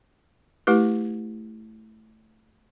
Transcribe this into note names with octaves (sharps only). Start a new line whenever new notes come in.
A3 E4 G4 B4